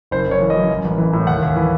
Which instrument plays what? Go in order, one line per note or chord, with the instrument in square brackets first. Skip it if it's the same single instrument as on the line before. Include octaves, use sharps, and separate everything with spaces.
[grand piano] F#1 C5
F#1 C#5
E3
D#5
F#2
A1
A1
E3
A2
D#2 F#5
D#2
E3